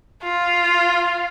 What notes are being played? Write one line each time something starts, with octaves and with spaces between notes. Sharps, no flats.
F4